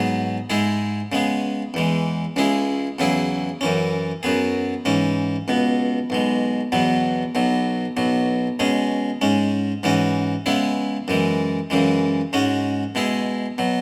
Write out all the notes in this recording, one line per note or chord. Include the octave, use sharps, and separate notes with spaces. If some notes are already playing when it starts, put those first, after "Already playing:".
Already playing: G#2 F#3 B3 G#4
G#2 G#3 E4 G#4
C#3 G#3 B3 G#4
E2 E3 G#3
C#2 C#3 G#3 E4 G#4
E2 C#3 F#3 E4 G#4
F#2 E3 C#4
F#2 F#3 B3 G#4
G#2 E3 C#4
C#2 B2 B3
B1 B2 G#3
E2 B2 F#3 B3
B1 B2 F#3
B1 B2 F#3
B2 G#3 C#4 G#4
G#2 G#3 C#4
G#2 E3 C#4 F#4
C#3 G#3 B3 E4
F#2 E3 G#3
F#2 C#3 E3 G#3
G#2 G#3 C#4 F#4
B2 G#3 E4 G#4
B2 F#3